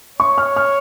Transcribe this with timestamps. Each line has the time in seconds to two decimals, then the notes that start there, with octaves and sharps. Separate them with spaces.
0.19 C#5 C#6
0.38 F6
0.56 F6